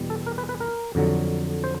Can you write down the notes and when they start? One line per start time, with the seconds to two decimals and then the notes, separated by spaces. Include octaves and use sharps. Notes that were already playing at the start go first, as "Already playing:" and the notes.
Already playing: E2 B2 G3
0.10 A4
0.27 A#4
0.38 B4
0.49 B4
0.60 A#4
0.95 F2 D3 F#3
1.64 C5